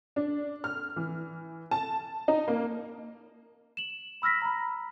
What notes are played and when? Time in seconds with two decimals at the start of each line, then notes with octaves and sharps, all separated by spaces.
0.16 D4
0.64 F6
0.96 E3
1.71 A5
2.28 D#4
2.48 A#3
3.77 E7 F#7
4.22 B5 E6 F6 A#6 B6
4.42 A#5 B5